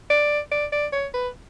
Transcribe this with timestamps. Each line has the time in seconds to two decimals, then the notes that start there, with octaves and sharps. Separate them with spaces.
0.10 D5
0.51 D5
0.72 D5
0.93 C#5
1.14 B4